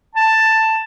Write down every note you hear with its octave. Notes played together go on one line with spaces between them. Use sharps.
A5